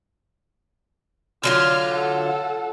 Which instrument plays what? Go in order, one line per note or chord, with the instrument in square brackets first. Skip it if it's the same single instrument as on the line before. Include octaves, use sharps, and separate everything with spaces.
[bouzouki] D3 F#3 F4 [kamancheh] F6
[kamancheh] A4 F#5